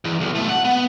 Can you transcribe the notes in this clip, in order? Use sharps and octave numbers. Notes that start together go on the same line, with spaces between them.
E2
B1
B1 A3
F#5
B3